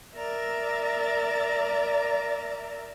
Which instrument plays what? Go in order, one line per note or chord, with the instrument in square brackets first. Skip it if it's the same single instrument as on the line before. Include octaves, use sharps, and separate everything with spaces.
[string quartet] A#4 D5 E5 A#5 A6